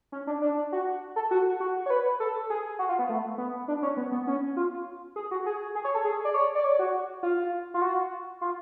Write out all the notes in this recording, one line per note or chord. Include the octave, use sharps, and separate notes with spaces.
C#4
D4
D4
F#4
A4
F#4
F#4
C#5
B4
A4
G#4
F#4
F4
B3
A3
B3
D4
C#4
B3
B3
C#4
F4
G#4
F#4
G#4
G#4
C#5
A4
G#4
D5
C#5
D5
C#5
F#4
F4
F4
F#4
F4